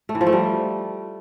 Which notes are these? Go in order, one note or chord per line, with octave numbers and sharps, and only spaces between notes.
A3
E3
F3
A3
G3